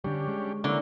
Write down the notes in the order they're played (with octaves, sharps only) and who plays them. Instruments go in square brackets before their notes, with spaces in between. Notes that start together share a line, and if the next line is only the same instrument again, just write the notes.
[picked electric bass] D3 G3 [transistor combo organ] C#4 D4 G4
[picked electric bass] G#3
[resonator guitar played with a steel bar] D3 [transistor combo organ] E3 A#3 C#4